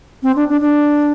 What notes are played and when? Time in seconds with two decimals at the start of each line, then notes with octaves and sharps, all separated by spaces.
0.23 C4
0.36 D4
0.49 D4
0.61 D4